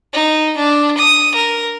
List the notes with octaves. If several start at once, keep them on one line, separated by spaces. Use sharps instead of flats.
D#4
D4
D#6
A#4